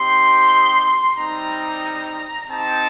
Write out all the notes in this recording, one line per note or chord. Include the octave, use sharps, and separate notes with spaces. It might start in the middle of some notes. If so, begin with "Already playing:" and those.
Already playing: C4 D#4 G4 C6
G3 C4 D#4 A#5
C4 D#4 G4 A5